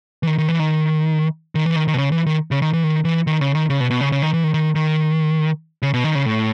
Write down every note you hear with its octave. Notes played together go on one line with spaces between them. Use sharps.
E3
D#3
D#3
E3
D#3
D#3
E3
D#3
D#3
B2
C#3
E3
D#3
C#3
D#3
E3
D#3
E3
D#3
C#3
D#3
C#3
B2
B2
C#3
C#3
D#3
E3
D#3
D#3
D#3
C#3
B2
D#3
C#3
A2